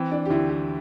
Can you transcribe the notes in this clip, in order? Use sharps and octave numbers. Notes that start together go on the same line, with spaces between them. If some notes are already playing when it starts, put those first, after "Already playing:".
Already playing: E3 C4
D4
G4
D2 E4
G4